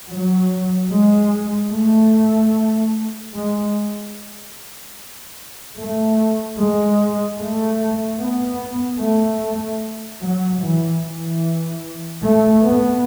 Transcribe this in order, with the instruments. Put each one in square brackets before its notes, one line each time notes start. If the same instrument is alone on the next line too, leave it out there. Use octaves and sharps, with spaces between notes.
[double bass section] F#3
G#3
A3
G#3
A3
G#3
A3
B3
A3
F#3
E3
E3
A3
B3